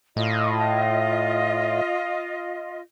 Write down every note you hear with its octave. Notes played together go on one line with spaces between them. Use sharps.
A2 F4 D#5